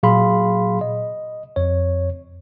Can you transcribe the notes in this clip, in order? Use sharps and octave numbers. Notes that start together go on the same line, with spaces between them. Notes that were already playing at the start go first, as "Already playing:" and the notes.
A#2 F#3 G#4 F5 B5 C6
D#5
F2 C#5